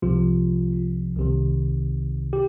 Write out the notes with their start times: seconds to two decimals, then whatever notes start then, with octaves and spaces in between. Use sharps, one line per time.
0.02 C2 C3 F3 F4
1.17 C2 C3 D#3
2.33 G4